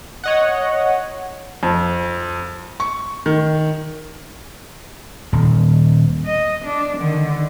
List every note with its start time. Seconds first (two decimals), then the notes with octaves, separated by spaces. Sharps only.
0.24 C#5 D#5 F#5
1.63 F2
2.80 C#6
3.26 D#3
5.32 D#1
6.25 D#5
6.65 D4
6.98 D3 D#3